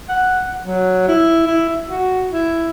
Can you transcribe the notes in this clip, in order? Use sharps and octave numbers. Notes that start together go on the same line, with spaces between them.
F#5
F#5
F#3
E4
E4
E5
F#4
E4